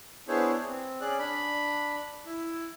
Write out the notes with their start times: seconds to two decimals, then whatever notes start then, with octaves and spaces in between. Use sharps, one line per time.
0.28 B3 D4 E4 G#4 C5 C#5
0.67 C4
1.01 C#4 G#4 D5 F#6
1.19 D4 B5
2.26 E4